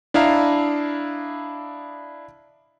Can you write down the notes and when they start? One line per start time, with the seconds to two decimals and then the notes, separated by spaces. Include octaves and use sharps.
0.14 D4 E4 D#5 F5 A5 A#5